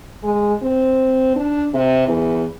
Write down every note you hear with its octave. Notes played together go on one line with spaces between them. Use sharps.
G#3
C4
D4
C3
E2